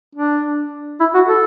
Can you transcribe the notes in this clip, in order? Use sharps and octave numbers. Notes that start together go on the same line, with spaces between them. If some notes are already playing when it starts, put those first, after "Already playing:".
D4
E4
F#4
A4